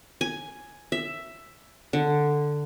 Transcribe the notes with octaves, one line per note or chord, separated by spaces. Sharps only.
G#5
E5
D3